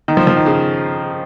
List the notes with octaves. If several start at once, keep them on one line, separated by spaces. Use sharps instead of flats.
D#3
F3
F3
D#3
C#3